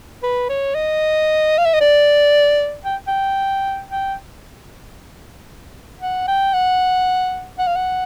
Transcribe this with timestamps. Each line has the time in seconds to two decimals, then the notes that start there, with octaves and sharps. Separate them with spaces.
0.23 B4
0.49 C#5
0.75 D#5
1.58 F5
1.66 E5
1.73 D#5
1.81 D5
2.85 G5
3.07 G5
3.91 G5
6.01 F#5
6.28 G5
6.53 F#5
7.59 F#5
7.67 F5
7.76 F#5